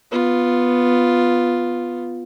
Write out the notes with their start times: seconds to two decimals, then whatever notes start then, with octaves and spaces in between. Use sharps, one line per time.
0.11 B3 F4